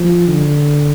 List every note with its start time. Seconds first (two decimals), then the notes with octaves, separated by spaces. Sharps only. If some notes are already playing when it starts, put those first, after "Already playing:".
Already playing: F3
0.28 D3